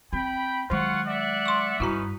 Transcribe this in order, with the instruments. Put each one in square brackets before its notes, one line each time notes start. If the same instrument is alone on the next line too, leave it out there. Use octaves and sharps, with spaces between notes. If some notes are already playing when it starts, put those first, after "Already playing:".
[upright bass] C4 [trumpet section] G5 B5
[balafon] D#3 [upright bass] F#3 G#3 [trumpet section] F4 F#5 C#6
[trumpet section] D5 E5 F#5
[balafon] C6 C#6
[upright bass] G2 [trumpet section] C#4 D#4 B4 [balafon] E4 F#4 A#5